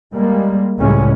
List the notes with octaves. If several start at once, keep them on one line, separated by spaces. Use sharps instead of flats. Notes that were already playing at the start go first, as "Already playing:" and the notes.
G3 G#3 A#3
C#2 A2 G3 G#3 C#4